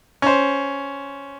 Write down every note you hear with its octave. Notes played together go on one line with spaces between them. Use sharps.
C#4 C5